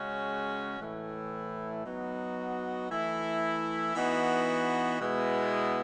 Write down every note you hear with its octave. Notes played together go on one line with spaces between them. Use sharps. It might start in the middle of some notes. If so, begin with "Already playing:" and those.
Already playing: C#3 G#3 C#4 F#4
A2 E3 A3 E4
F#3 B3 D#4 F#4
E3 A3 E4
E3 B3 D#4 F#4
B2 G#3 B3 E4